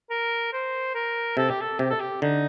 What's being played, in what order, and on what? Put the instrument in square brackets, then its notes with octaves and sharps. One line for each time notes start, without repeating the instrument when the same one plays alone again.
[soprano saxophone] A#4
C5
A#4
[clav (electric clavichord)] C3 [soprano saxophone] A4
[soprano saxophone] G4
A4
[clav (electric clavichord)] C3 [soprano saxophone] G4
[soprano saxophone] A4
G4
[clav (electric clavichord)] D3 [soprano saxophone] D#4